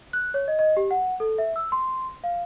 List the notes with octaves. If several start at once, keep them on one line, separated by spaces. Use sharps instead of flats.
F#6
C#5
D#5
D#5
G4
F#5
A4
E5
E6
C6
F5